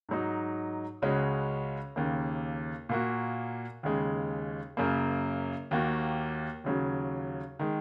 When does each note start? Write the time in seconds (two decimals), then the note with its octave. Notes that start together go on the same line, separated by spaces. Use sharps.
0.09 G#2 F#3 D#4
1.02 C#2 C#3 G#3 C#4 F#4
1.96 D#2 C#3 A#3
2.89 A#2 A#3 F#4
3.83 D#2 C#3 G#3
4.77 F#2 C#3 A#3
5.71 D#2 D#3 A#3 F#4
6.64 D#2 C#3 F#3
7.59 D#3 G#3